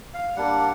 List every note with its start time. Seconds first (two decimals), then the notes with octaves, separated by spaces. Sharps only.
0.14 F5
0.36 G3 A#3 D4 F#5